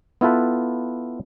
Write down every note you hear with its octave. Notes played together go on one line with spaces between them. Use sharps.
B3 E4 F4 A4 B4